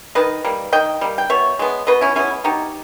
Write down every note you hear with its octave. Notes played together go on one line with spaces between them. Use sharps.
D#3 B4 D#5
G3 A#3
D#3 D#5 G5
G3 A#3
G5
B2 C#5 E5
G#3 B3
B2 B4 D#5
C#4 E4
G#3 B3 C#4 E4
B2 D#4 G4